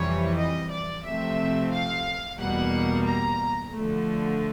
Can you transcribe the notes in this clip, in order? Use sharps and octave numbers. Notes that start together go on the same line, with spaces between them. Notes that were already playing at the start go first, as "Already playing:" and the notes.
Already playing: F2 C3 E3 G3 C#5
D#5
D5
C3 F3 A3 C4 E5
F5
E2 B2 G3 A#3 F#5
A#5
D3 F3 A3